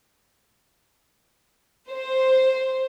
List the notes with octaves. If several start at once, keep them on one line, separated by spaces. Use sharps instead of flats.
C5